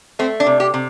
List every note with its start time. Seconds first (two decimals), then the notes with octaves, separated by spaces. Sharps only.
0.19 A3 C4
0.40 D4
0.46 C3
0.60 G4
0.74 C3